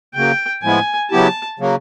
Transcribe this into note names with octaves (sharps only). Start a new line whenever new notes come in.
C#3 F#3 A#3 G5
A2 F3 G#3 B3 E4 G#5
C#3 F#3 B3 E4 G4 A5
C#3 F#3 A#3